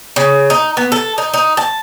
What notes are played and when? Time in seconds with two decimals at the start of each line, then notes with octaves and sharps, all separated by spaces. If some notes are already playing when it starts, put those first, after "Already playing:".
0.16 C#3
0.50 D#4
0.77 B3
0.92 A4
1.18 D#4
1.34 D#4
1.57 A5